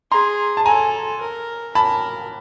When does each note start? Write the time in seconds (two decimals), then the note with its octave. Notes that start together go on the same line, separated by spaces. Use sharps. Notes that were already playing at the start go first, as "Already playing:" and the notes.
0.11 G#4 A#5 C6
0.57 A5
0.65 A4 G#5 A#5
1.21 A#4
1.75 A#4 A5 B5